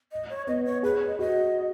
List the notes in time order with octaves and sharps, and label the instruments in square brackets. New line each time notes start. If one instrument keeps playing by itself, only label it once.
[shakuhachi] D#5
C#5
[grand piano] B3 [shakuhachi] D#5
[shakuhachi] C#5
[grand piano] G#4 [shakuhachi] B4
[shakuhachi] C#5
D#5
[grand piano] F#4 [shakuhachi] D#5